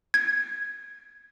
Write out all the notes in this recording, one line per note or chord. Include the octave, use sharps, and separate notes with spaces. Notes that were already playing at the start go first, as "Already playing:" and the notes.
G#6